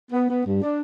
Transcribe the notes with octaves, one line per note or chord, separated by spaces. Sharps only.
B3
B3
G2
D4